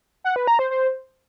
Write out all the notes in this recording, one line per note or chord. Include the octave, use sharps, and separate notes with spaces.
F#5
B4
A#5
C5
C5